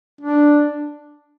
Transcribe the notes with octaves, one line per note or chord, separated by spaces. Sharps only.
D4